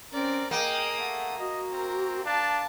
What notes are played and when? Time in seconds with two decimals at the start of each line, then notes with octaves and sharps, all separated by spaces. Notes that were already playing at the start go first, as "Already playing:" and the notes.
0.13 C4 C#4 A#4 D5
0.51 A#3 G#4 D#5 G5 D#6
0.99 A3 F#5
1.40 F#4 D#5
1.72 C4 A#4
2.25 D4 F5 A5